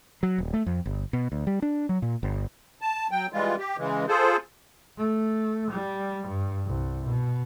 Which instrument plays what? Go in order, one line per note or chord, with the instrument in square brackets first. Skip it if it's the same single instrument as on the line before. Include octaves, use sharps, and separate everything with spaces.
[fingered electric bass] F#3
D#1
A3
F2
G1
B2
D2
G3
D4
F#3
A#2
G1
[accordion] A5
F#3 G5
E3 G3 G#3 F4
G4
C#3 E3 G#3
F4 G#4 A4 C5
[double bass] A3
G3
G2
C2
B2